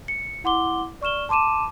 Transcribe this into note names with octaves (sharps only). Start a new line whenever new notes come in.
C#7
E4 F#5 C6 D6 G7
D5 C#6 F6 E7 G7
A5 C6 D6 D#7 E7